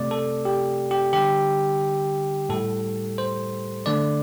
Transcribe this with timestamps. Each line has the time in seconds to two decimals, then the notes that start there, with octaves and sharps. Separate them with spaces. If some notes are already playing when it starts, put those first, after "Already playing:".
Already playing: C3 A3 D5
0.11 A4
0.45 G4
0.91 G4
1.13 D3 G3 G4
2.49 A2 G3 A4
3.18 C5
3.86 D3 A3 D5